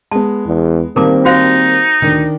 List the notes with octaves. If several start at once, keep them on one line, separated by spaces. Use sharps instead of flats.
G#3 B3 A5
E2
D#3 G3 A#3 C4 A#4 A5 D6
D#4 F#4 C5 F5
D2 D#3 D4